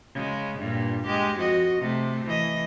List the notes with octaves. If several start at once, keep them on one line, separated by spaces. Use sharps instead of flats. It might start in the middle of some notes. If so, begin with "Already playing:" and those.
C#3 G#3
G2 A#2
G#3 G4
F2 F#4 D#5
C3 A3
E3 D#5